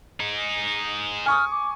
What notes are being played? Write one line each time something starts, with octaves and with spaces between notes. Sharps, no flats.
D#4 G#4
G#5 C#6 D#6 F6
D6